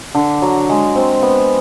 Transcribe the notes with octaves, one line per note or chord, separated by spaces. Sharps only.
D3
F#3
G#3
C4
B3